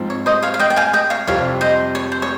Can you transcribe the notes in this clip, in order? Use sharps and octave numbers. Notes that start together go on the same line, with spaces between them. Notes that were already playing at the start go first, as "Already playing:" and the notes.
Already playing: G#2 F3 C4
C#5
C5 D#5
C#5 F5
F5
D#5 G5
G5
F5 G#5
D#5 G5
C#5 F5
F2 C3 G3 C4 C#5 F5
C5 D#5
C#5
C5
C#5